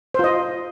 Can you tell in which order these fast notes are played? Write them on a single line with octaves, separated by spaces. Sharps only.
C5 F4 D#5